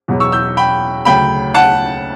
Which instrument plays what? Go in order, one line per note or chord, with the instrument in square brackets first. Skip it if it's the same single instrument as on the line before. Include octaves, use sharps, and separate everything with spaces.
[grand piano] E2 B2 F#3
C#6 E6
E6 G6
G5 B5
D2 C#3 F#3 G5 B5
F#5 A5